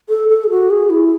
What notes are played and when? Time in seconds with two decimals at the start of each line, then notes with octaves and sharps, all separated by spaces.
0.09 A4
0.29 A4
0.44 G#4
0.50 F#4
0.70 G#4
0.90 E4